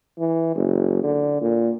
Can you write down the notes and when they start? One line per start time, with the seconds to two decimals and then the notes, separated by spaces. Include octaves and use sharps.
0.18 E3
0.55 F#1
1.03 D3
1.41 A#2